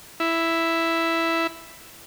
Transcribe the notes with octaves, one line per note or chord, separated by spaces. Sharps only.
E4